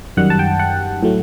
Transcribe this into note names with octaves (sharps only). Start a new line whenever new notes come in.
F#2 D#3 G3 F#5
A5
G5
F#5
A2 F#3 A3